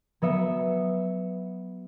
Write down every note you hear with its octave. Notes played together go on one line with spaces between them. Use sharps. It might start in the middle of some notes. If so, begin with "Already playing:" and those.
F#3 B3 E5 C#7